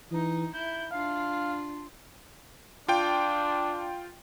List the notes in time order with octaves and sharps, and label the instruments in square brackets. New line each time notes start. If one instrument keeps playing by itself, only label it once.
[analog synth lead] E3 [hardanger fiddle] D#4
[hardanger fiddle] E4 [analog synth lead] G6
[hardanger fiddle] D4 F4 [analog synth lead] F5
[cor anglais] D4 [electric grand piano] F4 G5